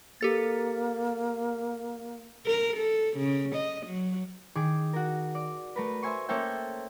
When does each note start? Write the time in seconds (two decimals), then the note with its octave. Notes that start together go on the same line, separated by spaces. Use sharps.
0.21 A#3 G4 A4 A6
2.47 A#4
2.77 A4
3.17 C#3
3.55 D#5
3.86 F#3
4.55 D#3 G#4 D6
4.93 F#4 A#4
5.35 D5
5.76 A3 A#4 B4
6.02 C5 E5 G#5 C6 C#6
6.29 A#3 C#4 A4 C5 E5 G5